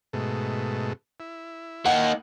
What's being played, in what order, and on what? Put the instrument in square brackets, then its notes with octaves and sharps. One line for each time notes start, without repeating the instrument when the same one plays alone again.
[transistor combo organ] G#2 B2 A3
E4
[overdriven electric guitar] A#3 D#4 [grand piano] F#5